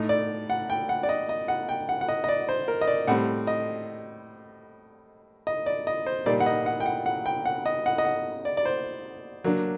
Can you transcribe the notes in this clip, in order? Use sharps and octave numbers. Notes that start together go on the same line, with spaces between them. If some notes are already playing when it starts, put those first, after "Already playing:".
Already playing: A2 A3 D#4
D5
F#5
G5
F#5
D5
D#5
D#5
F#5
G5
F#5
F#5
D#5
D#5
D5
C5
A#4
D#5
D5
A2 G3 C4 F#5
D#5
D#5
D5
D#5
C5
A#2 G3 A#3 D#4 D5
F#5
D#5
F#5
G5
F#5
F#5
G5
F#5
D#5
F#5
D#5
F#5
D5
D5
C5
F#3 A#3 D4